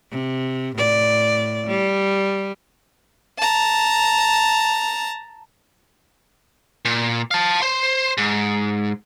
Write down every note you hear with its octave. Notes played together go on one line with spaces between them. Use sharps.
C3
A2 D5
G3
A5 A#5
A#2
F5 A5
C5 C6
G#2